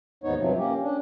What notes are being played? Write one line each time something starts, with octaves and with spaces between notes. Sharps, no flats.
D#2 G#2 B3 D#4 C#5
G2 C3 F3 F#3
A#3 C#4 G4
C#4 D4